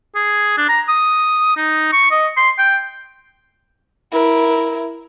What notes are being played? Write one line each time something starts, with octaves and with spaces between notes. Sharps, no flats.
G#4
D4
A#5
D#6
D#4
C#6
D#5
C6
G5
E4 A#4